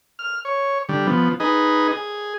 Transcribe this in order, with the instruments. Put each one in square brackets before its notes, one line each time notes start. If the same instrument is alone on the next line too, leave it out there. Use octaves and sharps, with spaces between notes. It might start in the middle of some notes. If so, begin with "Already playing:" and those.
[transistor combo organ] F6
C#5
D3 G3
F3 B3
D#4 G#4 B4 D#5
G#4